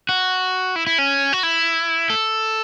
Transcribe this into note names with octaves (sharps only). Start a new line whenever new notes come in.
F#4
E4
E4
C#4
F#4
E4
A4